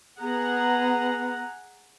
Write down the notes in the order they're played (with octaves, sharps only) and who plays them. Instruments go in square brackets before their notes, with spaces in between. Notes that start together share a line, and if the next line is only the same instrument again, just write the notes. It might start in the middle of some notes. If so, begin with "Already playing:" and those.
[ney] B3 [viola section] G#4 F#5 A#5